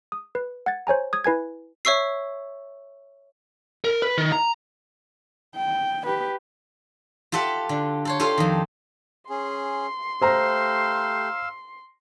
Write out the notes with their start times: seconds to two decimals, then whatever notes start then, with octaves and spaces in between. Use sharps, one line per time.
0.12 D#6
0.35 B4
0.66 F#5 G#6 A6
0.87 C5 C#5 G#5 A#5
1.13 D#6 G#6
1.24 E4 B4 G#5 G#6
1.85 C#5 E5 C#6 E6 C7
3.84 A#4
4.02 B4
4.18 D#3
4.32 A#5
5.56 G5
6.06 G4 B4
7.32 F4 G4 A4 E5 F#5
7.69 D3
8.05 A4 C5 C#5
8.20 F4 G4 A4 C5 F5
8.38 F2 D#3
9.30 C#4 G#4 C6
10.22 A3 G4 C5 F5 A#5 E6